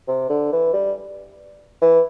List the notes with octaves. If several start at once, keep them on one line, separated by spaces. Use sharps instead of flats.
C3
D3
E3
G3
E3